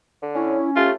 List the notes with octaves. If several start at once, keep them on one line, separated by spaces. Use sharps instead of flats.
D3
C#4 E4
A3 F4 G4